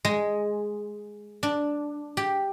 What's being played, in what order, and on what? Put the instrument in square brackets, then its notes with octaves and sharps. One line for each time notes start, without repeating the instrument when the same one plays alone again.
[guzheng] G#3
D4
G4